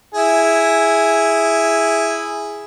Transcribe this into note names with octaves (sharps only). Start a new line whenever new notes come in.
E4 G#4